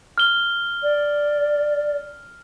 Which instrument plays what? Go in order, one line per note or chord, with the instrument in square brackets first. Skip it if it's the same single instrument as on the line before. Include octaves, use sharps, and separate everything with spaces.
[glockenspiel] F6 G7
[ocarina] D5